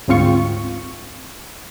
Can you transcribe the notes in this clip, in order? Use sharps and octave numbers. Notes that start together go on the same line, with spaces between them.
D2 G#2 C4 F4 C#6